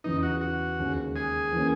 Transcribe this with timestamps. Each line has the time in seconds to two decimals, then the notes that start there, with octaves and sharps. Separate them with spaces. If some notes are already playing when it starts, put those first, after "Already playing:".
0.04 E2 C#3 E3 B3 D#4
0.23 F#4
0.41 F#4
0.79 D#2 C#3 G#3 C#4
1.16 G#4
1.52 E3 A#3 C#4